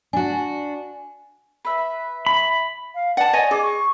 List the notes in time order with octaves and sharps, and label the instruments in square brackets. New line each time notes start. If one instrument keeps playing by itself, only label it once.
[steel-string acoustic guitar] D4 F#4 [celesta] G#5
[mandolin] B4 E5
[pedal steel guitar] B5
[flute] F5
[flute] D5 [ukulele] F#5 A5
[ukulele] C#5 D#5 G#5
[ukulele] G#4 [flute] D6
[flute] C#6